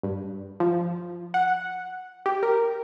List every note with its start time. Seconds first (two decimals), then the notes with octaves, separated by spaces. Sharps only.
0.03 G2
0.60 F3
1.34 F#5
2.26 G4
2.43 A#4